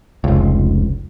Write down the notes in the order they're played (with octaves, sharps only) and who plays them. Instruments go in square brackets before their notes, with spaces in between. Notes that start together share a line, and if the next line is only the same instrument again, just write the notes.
[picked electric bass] F1 C#2